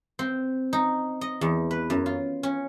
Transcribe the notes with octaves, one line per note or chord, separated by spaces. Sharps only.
C4
D#4
D#5
E2
B4
F#2
F4
C#4